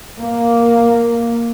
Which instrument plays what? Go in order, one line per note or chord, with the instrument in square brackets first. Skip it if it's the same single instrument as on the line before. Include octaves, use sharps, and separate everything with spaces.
[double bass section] A#3